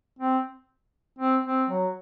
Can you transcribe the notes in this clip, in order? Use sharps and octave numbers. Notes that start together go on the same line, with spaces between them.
C4
C4
C4
F#3